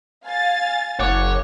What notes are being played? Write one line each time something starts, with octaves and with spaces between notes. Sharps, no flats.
F5 G#5 A6
F#1 C#5 F#5 D6